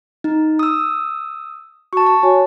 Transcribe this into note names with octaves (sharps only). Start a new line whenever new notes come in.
D#4
D#6 E6
F#4 A5 C#6
A5
F#4 C#5 G#5